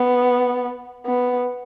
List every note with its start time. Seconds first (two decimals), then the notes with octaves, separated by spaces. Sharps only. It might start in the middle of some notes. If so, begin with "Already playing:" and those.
Already playing: B3
1.06 B3